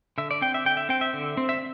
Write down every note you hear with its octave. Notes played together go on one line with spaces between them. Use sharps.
D3 E5
D5
C4 G5
E5
D3 G5
E5
C4 G5
E5
D3
C4
E5